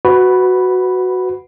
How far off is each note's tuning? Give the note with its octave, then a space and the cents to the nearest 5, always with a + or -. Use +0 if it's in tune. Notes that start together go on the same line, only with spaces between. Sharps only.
F#4 +0 B4 +15 B5 +0